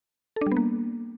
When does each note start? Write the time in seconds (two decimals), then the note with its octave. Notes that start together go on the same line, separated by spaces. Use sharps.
0.36 A4
0.41 D4
0.46 G3
0.52 B3
0.57 A#3